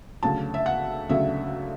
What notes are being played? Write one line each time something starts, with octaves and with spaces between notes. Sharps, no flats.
D2 C#3 F#3 A5
E5
F#5
D2 C#3 F#3 E5